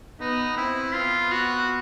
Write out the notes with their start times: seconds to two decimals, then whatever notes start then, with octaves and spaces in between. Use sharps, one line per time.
0.20 B3 D#4
0.57 C4 E4
0.94 B3 F4
1.32 F#4